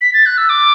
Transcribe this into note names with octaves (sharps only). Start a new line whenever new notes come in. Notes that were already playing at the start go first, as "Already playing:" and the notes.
B6
A6
F#6
E6
D6